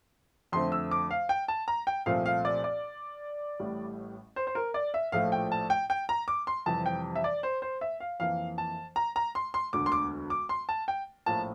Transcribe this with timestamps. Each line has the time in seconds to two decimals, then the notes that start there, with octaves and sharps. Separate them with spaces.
0.52 F2 D3 A3 C4 C6
0.72 E6
0.91 D6
1.11 F5
1.29 G5
1.48 A5
1.68 A#5
1.87 G5
2.06 C2 A#2 F3 A3 C4 F5
2.26 F5
2.45 D5
2.64 D5
3.59 A1 A2 G3
4.36 C5
4.47 C5
4.55 A#4
4.74 D5
4.94 E5
5.12 A#1 A2 F3 A3 F5
5.32 G5
5.52 A5
5.70 G5
5.90 G5
6.09 A#5
6.28 D6
6.47 C6
6.66 F2 C3 E3 G3 A5
6.86 G5
7.16 E5
7.24 D5
7.43 C5
7.62 C5
7.81 E5
8.00 F5
8.20 F2 E3 A#3 F5
8.58 A5
8.96 A#5
9.16 A#5
9.35 C6
9.54 C6
9.73 E1 D2 D3 D6
9.86 C6
9.92 D6
10.30 D6
10.49 C6
10.69 A5
10.88 G5
11.26 A#1 A2 F3 A#3 A5